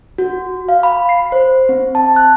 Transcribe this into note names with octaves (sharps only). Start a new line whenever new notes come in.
F#4
F5
B5
C7
C5
C4
A5
F#6